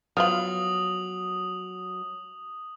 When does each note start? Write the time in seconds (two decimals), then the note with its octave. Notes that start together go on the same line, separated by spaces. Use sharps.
0.17 F3 F#3 B3 F4 D#6 F#7